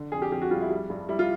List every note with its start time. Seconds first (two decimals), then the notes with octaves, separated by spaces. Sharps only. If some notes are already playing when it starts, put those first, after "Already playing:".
Already playing: D3
0.12 F2 G#4
0.22 G4
0.32 F2 G4
0.42 F#4
0.51 G3 F4
0.61 E4
0.70 G3
0.90 G2
1.09 G3 E4
1.19 F4